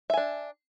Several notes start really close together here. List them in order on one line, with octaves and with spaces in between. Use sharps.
E5 G#5 D4